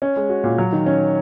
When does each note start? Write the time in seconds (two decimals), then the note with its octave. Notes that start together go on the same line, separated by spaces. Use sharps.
0.02 C#4
0.16 G#3
0.29 F#4
0.44 A#2
0.58 F#3
0.72 D#3
0.86 C#4